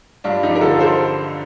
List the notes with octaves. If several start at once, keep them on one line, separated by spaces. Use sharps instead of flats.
G2 D4 F4
F3 D#4 G4
A#4
D3 F4 A4
A4 C5